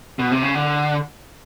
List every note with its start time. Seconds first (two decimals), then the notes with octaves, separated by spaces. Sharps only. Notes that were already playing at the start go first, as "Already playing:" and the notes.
0.19 B2
0.32 C3
0.43 C#3
0.55 D3